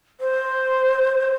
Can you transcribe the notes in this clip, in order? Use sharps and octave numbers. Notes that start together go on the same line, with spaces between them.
C5